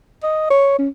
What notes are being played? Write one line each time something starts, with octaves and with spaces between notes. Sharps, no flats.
D#5
C#5
C#4